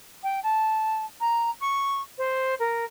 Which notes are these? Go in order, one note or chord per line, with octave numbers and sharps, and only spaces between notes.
G5
A5
A#5
C#6
C5
A#4